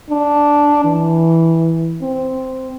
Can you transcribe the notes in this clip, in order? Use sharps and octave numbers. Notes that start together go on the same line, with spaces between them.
D4
E3
C4